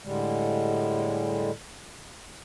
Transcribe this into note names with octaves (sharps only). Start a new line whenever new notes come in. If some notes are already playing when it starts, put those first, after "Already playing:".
A2 D3 G3 G#3